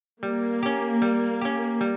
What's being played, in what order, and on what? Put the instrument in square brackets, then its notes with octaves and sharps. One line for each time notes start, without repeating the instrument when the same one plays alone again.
[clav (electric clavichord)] G3 [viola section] A#3
[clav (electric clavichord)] C#4 G4
G3
C#4 G4
G3